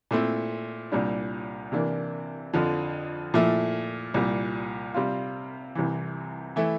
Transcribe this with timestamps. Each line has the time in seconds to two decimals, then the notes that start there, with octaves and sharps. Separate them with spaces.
0.11 A#2 A3 C4 E4
0.92 C2 A#2 G3 D4
1.72 C3 E3 A#3 D4
2.53 F2 D3 F3
3.34 A#2 F3 A3 E4
4.14 C2 A#2 G3
4.94 C3 G3 C4 F4
5.75 C2 C3 E3
6.56 E3 A3 E4